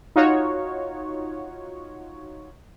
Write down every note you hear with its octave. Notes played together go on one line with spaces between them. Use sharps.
D#4 F4 F#4 C#5